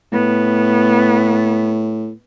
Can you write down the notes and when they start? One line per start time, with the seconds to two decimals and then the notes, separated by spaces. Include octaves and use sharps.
0.13 A2 B3